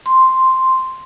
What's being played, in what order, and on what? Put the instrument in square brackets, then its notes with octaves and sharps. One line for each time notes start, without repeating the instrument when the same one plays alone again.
[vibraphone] C6